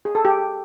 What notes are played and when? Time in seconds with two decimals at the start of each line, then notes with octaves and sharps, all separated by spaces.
0.05 G#4
0.15 A4
0.25 G4